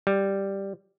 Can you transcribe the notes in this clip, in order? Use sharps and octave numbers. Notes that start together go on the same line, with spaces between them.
G3